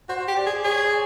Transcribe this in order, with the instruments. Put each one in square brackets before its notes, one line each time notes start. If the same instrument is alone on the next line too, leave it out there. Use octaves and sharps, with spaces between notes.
[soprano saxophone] F#4 [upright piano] C5
[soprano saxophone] G4
[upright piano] D5
[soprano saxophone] G#4
[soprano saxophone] G#4 [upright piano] C#5
[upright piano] C#5